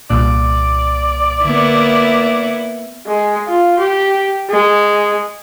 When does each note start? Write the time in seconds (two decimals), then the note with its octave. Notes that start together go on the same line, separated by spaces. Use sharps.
0.10 C2 A#2 D5
1.45 D3 A#3 B3 E4
3.07 G#3
3.49 F4
3.79 G4
4.50 G#3